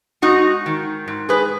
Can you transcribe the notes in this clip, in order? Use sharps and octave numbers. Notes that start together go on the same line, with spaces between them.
G#2 D#4 F#4
D#3
G#2
G#4 B4